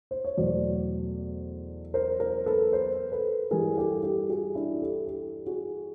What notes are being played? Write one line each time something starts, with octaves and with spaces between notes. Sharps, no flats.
C5
C#5
E2 B2 F#3 A3 C5 D5
A#4 C5
A#4 C5
A4 B4
A#4 C5
A4 B4
G2 E3 G3 G#4 A#4
G4 A4
G4 A4
F#4 G#4
D4 E4
G4 A4
G4 A4
F#4 G#4